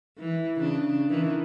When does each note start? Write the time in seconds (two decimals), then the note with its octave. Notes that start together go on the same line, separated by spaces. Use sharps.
0.20 E3
0.60 C#3 D4
1.10 D#3 E3